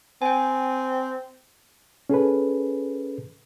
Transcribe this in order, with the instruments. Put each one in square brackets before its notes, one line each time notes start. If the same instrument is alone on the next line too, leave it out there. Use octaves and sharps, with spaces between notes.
[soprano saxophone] C4 [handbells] G5 G#5
[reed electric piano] C#4 G#4 A4 B4